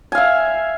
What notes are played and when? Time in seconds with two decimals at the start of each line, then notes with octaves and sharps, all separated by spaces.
0.12 G#5
0.15 F5
0.18 E5